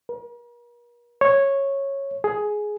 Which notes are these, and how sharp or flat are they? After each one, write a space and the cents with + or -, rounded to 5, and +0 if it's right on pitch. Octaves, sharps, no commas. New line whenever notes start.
A#4 +45
C#5 -10
G#4 +10